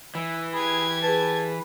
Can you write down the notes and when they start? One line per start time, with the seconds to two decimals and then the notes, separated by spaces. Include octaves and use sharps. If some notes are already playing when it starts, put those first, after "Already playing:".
0.15 E3 E5
0.54 G4 G#4 B5 G#6
1.03 G#4 B4 A5